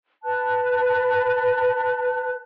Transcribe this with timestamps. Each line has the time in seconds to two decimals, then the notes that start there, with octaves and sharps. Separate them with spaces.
0.24 B4 A5 F#6